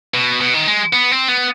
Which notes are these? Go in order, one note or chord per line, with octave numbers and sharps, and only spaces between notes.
B2
B2
D#3
G#3
B3
C4
B3